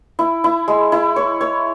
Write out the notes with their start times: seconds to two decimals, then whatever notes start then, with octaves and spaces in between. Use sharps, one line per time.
0.19 E4
0.44 E4
0.68 G#3
0.92 E4
1.16 C#5
1.41 C#5